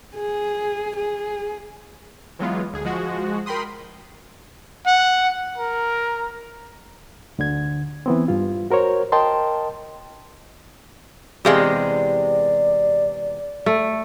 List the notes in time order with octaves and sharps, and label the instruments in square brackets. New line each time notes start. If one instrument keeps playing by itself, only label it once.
[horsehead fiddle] G#4
G#4
[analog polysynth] E3 F#3 G#3 B3 F4
D2 G#4
F3 G#3 F#4
A#4 G5 B5 C6 D#6
[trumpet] F#5
A#4
[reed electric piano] D2 D3 G#6
E3 B3 C4
G2 F4
F#4 A#4 C5 C#5
A#4 D#5 G5 A5 C6
[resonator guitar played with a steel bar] E2 C3 G#3 [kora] G4 F5 [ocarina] D5
[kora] A3